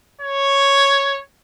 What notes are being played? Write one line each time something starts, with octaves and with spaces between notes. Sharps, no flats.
C#5